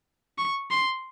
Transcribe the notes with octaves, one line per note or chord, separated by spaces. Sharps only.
C#6
C6